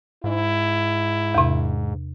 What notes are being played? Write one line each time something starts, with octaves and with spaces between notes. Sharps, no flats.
G#2 E4
E2 C3